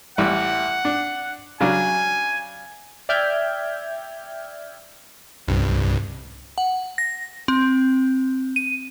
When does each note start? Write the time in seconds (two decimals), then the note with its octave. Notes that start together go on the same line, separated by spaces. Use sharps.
0.18 A1 G3 F#5
0.85 D4
1.61 C#3 F#3 D4 G#5
3.09 D5 E5 G5 F6 G6 G#6
5.48 C2 G2
6.58 F#5
6.98 A#6
7.48 C4
8.56 D#7